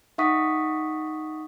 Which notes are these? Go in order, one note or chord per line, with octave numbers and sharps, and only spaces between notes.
D#4 E5 F#5 C#6 D#6 B6